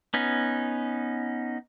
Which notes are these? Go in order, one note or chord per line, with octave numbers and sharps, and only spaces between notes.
B3 C#4 D#4